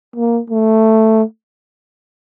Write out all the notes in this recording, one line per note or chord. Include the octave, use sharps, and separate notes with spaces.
A#3
A3